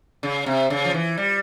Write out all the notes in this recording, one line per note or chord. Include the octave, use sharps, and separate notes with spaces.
C#3
C3
C#3
F3
E3
G3